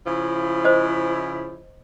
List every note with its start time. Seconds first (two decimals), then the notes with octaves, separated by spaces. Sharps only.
0.06 C#3 F3 E4
0.65 C5 D#5